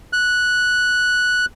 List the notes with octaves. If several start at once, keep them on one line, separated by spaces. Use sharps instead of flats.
F#6